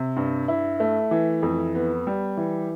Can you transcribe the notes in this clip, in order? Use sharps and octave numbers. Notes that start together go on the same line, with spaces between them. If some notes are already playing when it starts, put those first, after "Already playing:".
Already playing: C3
G2
E4
A3
E3
F2
B3
G3
E3